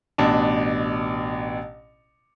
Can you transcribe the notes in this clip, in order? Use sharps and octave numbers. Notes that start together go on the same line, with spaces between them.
A1 B2 D4 A5